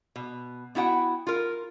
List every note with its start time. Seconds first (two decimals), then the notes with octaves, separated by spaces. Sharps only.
0.16 B2
0.75 B3 E4 F#4 F#5 G5
1.27 F4 A#4